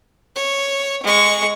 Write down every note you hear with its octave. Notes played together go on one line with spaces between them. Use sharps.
C#5
G#3 C#6